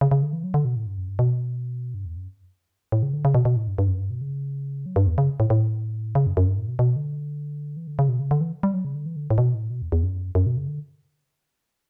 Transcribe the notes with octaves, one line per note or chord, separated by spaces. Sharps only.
C#3
C#3
D3
E3
F#3
D3
B2
A2
G2
F#2
G2
B2
G2
E2
F#2
A2
C#3
D3
C#3
B2
B2
A2
G2
G2
F#2
G2
B2
C#3
F#3
G2
E2
C#3
A2
A2
C#3
F#2
F#2
G2
A2
B2
B2
D3
E3
D3
C#3
B2
C#3
D3
E3
G3
F#3
C#3
D3
E3
D3
A2
B2
A2
B2
E2
E2
F#2
F#2
B2
C#3
D3